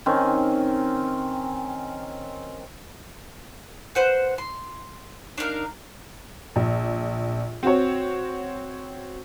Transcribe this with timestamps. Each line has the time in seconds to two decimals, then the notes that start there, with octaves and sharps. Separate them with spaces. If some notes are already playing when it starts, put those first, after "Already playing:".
0.06 D#3 C4 C#4
3.95 B4 C5 F#5
4.38 C6
5.38 D4 D#4 A#4 F5
6.56 A#1
7.63 C4 F#4 C#5